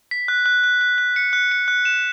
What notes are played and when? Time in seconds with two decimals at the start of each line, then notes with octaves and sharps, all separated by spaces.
0.11 B6
0.28 F#6
0.46 F#6
0.64 F#6
0.81 F#6
0.98 F#6
1.16 C#7
1.33 F#6
1.51 C#7
1.68 F#6
1.85 E7